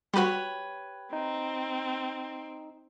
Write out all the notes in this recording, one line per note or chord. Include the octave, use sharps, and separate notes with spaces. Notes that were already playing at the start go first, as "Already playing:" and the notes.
G3 F#4 G4 B4 C#5
C4 D#4